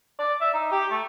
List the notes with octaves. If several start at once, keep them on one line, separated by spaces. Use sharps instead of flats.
D5
E5
D#4
G4
A3